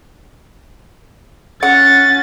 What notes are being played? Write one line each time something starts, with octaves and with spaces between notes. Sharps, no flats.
C#4 F#5 A6